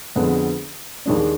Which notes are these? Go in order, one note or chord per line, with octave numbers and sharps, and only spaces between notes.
F2 D3 G#3 B3
D#2 D#3 G#3 D4